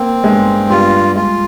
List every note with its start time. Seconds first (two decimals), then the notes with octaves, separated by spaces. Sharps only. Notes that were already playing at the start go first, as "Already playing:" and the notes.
Already playing: A#3 C4
0.24 G2 G#3
0.70 G3 F4
1.15 G#3 F4